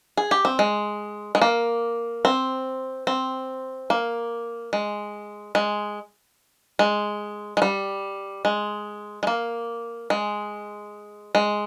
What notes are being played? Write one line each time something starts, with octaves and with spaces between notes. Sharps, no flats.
G#4
G4
C4
G#3
G#3
A#3
C4
C4
A#3
G#3
G#3
G#3
G#3
G3
G#3
G#3
A#3
G#3
G#3